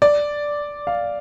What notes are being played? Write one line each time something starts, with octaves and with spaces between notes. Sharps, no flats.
D5
F5